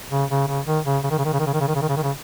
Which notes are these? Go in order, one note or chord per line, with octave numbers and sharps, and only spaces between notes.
C#3
C#3
C#3
D#3
C#3
C#3
D#3
C#3
D#3
C#3
D#3
C#3
D#3
C#3
D#3
C#3
D#3
C#3
D#3
C#3